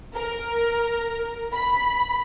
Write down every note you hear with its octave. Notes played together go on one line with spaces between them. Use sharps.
A#4
B5